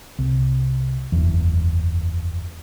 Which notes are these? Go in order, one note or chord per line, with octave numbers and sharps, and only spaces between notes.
C2
F#1 E2